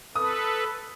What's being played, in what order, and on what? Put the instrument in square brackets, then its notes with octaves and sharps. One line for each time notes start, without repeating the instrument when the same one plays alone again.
[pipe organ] A4 B4 [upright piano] D#6